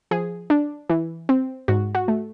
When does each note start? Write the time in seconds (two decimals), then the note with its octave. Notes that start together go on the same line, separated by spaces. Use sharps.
0.11 F3 G#4
0.50 D4
0.89 E3
1.29 C4
1.68 G#2 F#4
1.95 F#4
2.08 A3